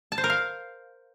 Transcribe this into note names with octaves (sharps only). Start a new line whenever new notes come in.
A5
C5
A#4
F5